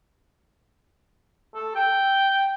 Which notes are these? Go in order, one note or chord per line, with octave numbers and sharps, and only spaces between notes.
A4
G5